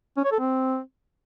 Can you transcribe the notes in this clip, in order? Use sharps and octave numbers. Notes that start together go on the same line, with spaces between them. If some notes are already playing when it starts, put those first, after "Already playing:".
C#4
C#5
A4
C4